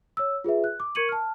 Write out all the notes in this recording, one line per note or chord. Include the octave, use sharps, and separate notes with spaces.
C#5 E6
F4 G#4 B4 E5
F#6
D6
A#4 C#6 G#6 C#7 D#7 F#7
A5 F6